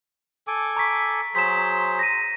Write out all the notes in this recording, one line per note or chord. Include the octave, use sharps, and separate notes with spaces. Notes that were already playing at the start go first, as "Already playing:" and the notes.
A4 G#5 D6
A#5 C#6 B6
F#3 G#4 C5 B6 E7
A#6 D#7